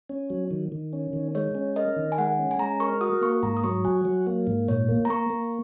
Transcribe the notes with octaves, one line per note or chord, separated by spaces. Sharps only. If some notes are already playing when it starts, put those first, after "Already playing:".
C#4
F#3
D#3
D#3
C#4
D#3
G#3 C#5
C#4
A#4 D#5
D#3
G#5
G#3 F#5
C#4
G#5
G#3 A#5
A#4 C#6
F#4 D#6
A#3 C#6
G#2 A#5
D#6
F#3 C#6
F#4 G#5
F#3
A#3
G#2
A#2 C#5
A#3
A#5
A#3 C#6
A#3